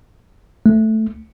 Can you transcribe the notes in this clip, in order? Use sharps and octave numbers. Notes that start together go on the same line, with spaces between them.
A3